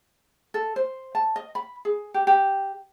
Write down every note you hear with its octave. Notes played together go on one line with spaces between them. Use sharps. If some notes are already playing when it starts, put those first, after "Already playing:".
A4
C5
A5
D#5
B5
G#4
G4
G4